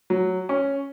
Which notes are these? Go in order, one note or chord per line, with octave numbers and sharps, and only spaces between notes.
F#3
C#4